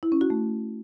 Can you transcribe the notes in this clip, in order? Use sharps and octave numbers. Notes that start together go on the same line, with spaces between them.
E4
C#4
F#4
A3